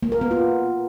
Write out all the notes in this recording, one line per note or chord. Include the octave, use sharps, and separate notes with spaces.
A#3
A#4
B3
F4